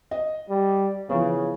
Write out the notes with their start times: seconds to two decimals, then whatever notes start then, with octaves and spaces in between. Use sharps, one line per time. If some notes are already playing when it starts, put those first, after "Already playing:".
0.11 D#5
0.49 G3
1.09 C#3 E3 F3 B3